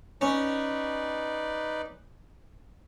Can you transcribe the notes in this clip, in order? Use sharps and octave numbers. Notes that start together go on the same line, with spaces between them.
C#4 D#4 B4 D5